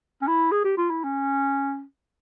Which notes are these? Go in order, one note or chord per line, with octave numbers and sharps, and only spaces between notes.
C#4
E4
G#4
G4
F4
E4
C#4